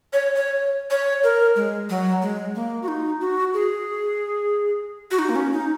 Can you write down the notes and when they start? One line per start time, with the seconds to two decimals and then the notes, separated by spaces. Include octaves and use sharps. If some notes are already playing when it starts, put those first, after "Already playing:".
0.13 C#5
0.35 C#5
0.91 C#5
1.24 A#4
1.56 G#3
1.90 F#3
2.22 G#3
2.55 A#3
2.83 F#4
2.88 D#4
3.21 F#4
3.54 G#4
5.11 F#4
5.19 D#4
5.29 A#3
5.36 C#4
5.53 D#4